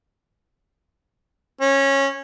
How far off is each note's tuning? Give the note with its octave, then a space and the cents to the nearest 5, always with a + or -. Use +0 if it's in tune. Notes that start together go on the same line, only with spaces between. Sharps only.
C#4 -15